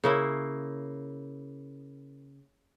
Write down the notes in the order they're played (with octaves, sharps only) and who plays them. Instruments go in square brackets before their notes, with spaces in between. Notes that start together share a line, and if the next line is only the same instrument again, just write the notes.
[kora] C#3 A#3 E4